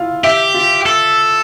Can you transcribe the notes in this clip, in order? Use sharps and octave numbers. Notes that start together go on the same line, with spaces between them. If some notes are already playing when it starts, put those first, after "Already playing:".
Already playing: E4 F4 F5
G4 E5
F4
A4